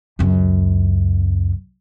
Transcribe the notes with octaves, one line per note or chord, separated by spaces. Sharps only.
C#2 F#2